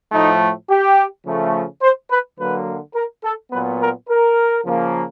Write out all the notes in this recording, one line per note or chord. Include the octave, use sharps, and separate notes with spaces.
A2 F3 A3 D#4
G4
C#3 F3 A3
C5
B4
D3 F#3 A#3 B4
A#4
A4
A#2 F#3 B3 B4
A#4
A#4
C#3 F3 A#3